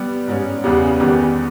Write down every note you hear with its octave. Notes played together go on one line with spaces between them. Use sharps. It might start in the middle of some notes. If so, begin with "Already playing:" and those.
Already playing: G3 B3 G4
G#2 G3 C#4
E2 C#3 G3 B3 G4
E2 D#3 G3 B3 G4